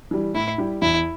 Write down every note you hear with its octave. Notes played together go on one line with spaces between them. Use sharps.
E3 G3
A2 E4
G3 E4 G4
E2 E4